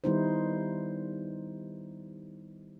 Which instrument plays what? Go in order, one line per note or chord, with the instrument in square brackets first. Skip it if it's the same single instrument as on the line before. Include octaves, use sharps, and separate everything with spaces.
[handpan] D#3 G3 B3 D#4 E4 C5